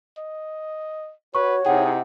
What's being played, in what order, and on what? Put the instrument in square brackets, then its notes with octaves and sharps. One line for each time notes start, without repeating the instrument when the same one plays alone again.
[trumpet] D#5
[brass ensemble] F#4 [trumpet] B4 [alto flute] C#5 [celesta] C#6
[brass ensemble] C3 D#4 E4 [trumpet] G#4 [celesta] F#5 G5